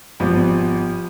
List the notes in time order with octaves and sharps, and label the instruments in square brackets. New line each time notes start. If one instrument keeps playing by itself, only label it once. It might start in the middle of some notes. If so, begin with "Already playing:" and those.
[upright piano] G#1 B2 [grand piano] F3 G3 B3